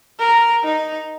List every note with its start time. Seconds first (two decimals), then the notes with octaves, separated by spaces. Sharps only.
0.19 A#4
0.64 D#4